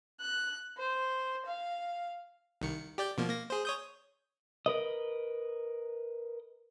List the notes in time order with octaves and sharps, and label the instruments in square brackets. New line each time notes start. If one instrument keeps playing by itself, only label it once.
[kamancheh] F#6
C5
F5
[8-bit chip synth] C2 D#3 C#7
G4 D5 G6
B2 F3 A#3
A#3 A#6
G#4 C5
C#5 D#6 G6
[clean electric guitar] A#4 B4 D#5